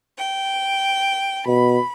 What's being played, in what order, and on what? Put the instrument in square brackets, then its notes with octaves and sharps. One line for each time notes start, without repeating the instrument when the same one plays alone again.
[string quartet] G5
[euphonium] B2 [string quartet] B5